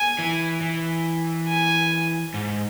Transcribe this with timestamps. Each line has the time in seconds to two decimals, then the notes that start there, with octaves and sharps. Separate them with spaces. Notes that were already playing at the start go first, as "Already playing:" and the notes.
Already playing: G#5
0.19 E3
0.61 E3
1.48 G#5
2.34 G#2